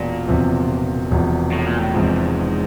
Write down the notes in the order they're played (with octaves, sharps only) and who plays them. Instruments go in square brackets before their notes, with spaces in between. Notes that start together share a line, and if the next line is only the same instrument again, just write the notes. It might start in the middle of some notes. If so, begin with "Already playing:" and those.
Already playing: [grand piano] E1 E2 [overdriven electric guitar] A#2
[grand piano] E1 E2 C3 F3
E1 E2 C3 F3
[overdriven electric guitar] A2
A#2
A2
[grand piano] E1 E2 C3 F3 [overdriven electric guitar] G#2